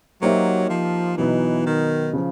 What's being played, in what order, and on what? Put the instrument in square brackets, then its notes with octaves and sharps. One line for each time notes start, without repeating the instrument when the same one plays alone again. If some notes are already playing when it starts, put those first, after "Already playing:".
[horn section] F#3 [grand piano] A#3 D#4 G4 C5 E5
[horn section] F3
[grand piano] B2 F#3 B3 D#4 [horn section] E3
[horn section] D#3
[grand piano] C#3 F3